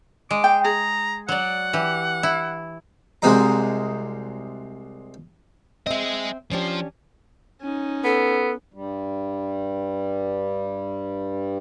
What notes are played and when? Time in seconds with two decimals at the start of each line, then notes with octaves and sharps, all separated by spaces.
0.31 G#3 D6
0.44 G5
0.65 G#4 A#5
1.28 F#3 D5 F#5
1.73 E3 G4
2.23 E4
3.22 C2 G#3 C4 F#4 D#5 A#5
5.87 C4 G#4 D#5 E5
6.52 F3 C#4 D4 G4
7.61 C#4 D#4
8.04 B3 A4
8.74 G2 G3